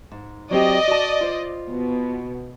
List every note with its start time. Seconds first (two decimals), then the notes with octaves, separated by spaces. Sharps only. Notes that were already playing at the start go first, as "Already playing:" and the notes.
0.12 G#2
0.51 F#3 C4 G4 D5 D#5
0.88 F#4 A5
1.21 F4 C5
1.68 B2